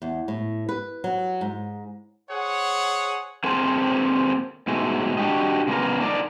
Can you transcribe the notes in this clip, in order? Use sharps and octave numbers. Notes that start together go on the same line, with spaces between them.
E2
A2
B4
F#3
G#2
G#4 C5 C#5 F#5
A#3 C4 G#4 A4 C5
G#2 B2 G#3 A3
D4 F#4 G4 D#5
C#3 G#3 A#3 B3 A#4
D4 D#4 A#4 D5